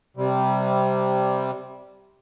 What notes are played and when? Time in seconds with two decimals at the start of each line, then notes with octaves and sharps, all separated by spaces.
0.17 C3 G3